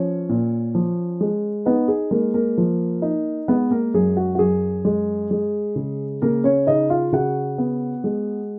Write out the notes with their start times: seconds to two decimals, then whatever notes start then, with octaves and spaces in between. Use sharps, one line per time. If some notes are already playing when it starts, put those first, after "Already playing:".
Already playing: F3 C#4 C#5
0.29 A#2
0.75 F3
1.21 G#3
1.65 B3 D#4 B4
1.88 G#4
2.11 G#3 A#3 A#4
2.34 A#3 A#4
2.58 F3
3.02 D#4
3.48 G#3 B3 B4
3.70 A#3 A#4
3.94 F#2 G#4
4.17 F#4
4.35 F#4
4.39 F#2 G#4
4.85 G#3
5.31 G#3
5.76 C#3
6.22 C#3 A#3 A#4
6.44 C#4 C#5
6.67 C#3 D#4 D#5
6.90 F4 F5
7.12 C#3 F#4 F#5
7.58 B3
8.04 G#3